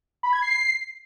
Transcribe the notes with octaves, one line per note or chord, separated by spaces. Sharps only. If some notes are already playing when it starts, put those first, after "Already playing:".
B5
G#6
C7